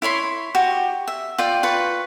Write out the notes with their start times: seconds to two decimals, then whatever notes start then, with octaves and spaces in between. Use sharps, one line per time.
0.02 E4 C#5 B5 C6
0.55 F#4 G4
1.07 E5
1.38 F4 D5 G5
1.63 F4 B4 C#6